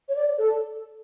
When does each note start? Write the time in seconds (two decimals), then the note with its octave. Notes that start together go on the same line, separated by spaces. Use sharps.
0.09 C#5
0.16 D5
0.38 A4